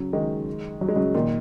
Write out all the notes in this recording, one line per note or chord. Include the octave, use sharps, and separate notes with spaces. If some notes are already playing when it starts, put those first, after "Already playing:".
Already playing: C#3 F#3
D#3 G#3
F#3
G#3
C#3 F#3
A#2 D#3